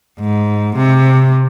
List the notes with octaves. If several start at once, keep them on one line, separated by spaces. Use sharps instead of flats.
G#2
C3